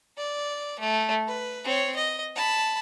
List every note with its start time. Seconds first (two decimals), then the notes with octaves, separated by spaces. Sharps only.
0.17 D5
0.79 A3
1.27 B4
1.65 C4 C#5
1.96 D#5
2.35 A5 B5